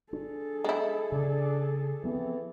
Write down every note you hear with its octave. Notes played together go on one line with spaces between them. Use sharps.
D4 G#4 A4
G#3 E4
C#3 D4
E3 F3 B3 C4